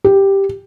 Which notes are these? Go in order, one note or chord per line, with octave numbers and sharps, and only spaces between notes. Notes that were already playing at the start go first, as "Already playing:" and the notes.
G4